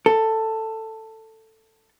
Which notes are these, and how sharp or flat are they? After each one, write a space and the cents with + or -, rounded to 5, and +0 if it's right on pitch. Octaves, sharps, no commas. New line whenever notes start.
A4 +10